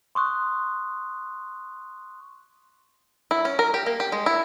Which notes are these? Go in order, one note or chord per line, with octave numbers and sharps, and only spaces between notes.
C6 C#6 D#6 F#6
E4
C#4
A#4
G4
A#3
G4
G#3
E4